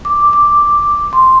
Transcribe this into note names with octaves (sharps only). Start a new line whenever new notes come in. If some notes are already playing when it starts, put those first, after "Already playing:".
D6
D6
C6